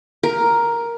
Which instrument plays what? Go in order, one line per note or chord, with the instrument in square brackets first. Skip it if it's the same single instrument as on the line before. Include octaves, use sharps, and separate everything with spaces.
[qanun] A#4